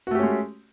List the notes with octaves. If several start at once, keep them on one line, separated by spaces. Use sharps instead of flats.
G#3 A3 C#4 F#4 G4